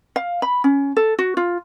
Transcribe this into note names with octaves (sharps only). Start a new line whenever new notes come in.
F5
B5
C#4
A4
F#4
F4